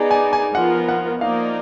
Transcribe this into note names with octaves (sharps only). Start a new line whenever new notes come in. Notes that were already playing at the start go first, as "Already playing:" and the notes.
Already playing: B3 D#4 G#4 D5 G#5
G#5
G#5
F3 B3 F4 A#4 F#5
F#5
F3 A#3 D#4 A#4 D5 F5